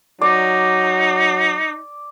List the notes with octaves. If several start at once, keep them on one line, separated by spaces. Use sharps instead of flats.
F#3 D#4 D5